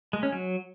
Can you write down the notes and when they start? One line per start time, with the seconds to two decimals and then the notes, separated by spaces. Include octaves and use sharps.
0.13 G#3
0.23 C#4
0.33 F#3